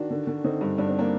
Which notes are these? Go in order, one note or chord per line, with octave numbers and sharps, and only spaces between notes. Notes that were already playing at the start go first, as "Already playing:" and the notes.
Already playing: D#3 D4 F#4
D3
D3
D3 C4 D#4
G2
G2 D4
C4
A#3 D4